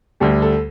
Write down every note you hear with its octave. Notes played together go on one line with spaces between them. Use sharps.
D2 D3 G3 G4
A4